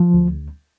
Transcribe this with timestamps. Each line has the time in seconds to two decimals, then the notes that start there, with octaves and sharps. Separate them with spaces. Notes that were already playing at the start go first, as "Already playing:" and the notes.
Already playing: F3
0.14 D2